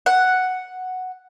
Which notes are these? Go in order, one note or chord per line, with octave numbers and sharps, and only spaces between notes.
F#5